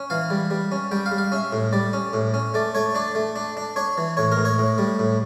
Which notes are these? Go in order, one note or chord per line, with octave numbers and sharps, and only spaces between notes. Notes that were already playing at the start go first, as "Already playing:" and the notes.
Already playing: C#4
E3 F5
G3
G3
C#4
G3 G5
F5
G3
F5
C#4 E5
A2
G3 D5
C#4
A2
C#4
A3 D5
A3 C#5
D4 D5
A3
D4
D4
D4 C#5
E3
A2 C#5
A#4
A2
C#5
A2
G3
A2